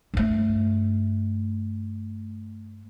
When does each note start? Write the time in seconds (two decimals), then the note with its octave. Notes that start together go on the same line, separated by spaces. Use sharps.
0.14 G2 A3